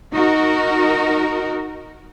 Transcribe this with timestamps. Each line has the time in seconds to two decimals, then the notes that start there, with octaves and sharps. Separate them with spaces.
0.13 D#4 F#4 A#4